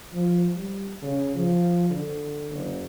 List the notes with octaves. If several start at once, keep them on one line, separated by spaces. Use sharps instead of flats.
F3
G3
C#3
F3
D3
F#1